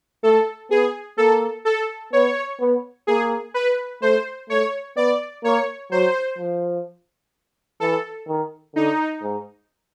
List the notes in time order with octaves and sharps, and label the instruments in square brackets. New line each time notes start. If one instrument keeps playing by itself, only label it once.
[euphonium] A3 [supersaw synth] A4
[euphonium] B3 [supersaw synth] G#4
[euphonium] A#3 [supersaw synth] A4
[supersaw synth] A4
[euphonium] B3 [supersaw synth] C#5
[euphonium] B3
[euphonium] A#3 [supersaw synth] G#4
[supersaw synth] B4
[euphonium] A3 [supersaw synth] C5
[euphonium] A3 [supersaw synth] C#5
[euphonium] B3 [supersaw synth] D5
[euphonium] A#3 [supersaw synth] C#5
[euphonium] F#3 [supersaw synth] C5
[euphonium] F3
[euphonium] E3 [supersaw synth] A4
[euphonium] D#3
[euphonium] D3 [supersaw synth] D#4
[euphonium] G#2